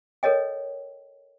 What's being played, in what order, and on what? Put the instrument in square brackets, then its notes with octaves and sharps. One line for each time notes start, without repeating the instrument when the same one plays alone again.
[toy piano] A4 A#4 C#5 D#5 G5